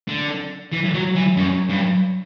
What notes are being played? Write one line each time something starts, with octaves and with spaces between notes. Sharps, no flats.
D3
E3
F#3
E3
F#2
G2